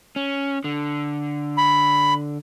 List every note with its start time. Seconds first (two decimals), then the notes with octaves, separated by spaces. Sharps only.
0.16 C#4
0.64 D3
1.58 B5